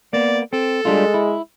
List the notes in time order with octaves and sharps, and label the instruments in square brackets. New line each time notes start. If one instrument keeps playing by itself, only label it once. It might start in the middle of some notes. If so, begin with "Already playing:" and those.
[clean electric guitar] A#3 B3 [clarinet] D5
[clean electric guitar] C4 [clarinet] A4
[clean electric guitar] G3 D4 F4 [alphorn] G#3
[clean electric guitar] E4